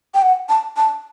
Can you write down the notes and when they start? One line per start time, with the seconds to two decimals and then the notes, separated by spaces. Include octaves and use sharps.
0.14 G5
0.22 F#5
0.49 A5
0.77 A5